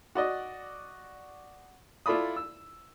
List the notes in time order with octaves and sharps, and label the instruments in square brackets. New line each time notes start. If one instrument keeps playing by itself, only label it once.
[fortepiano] F#4 D5 D#5
E4 F4 A4 D5 B5 D#6
E6